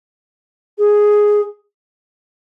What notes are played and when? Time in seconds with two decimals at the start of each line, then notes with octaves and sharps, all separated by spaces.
0.78 G#4